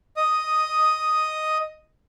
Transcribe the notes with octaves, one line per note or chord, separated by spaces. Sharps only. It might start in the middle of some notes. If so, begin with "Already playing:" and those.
D#5 D#6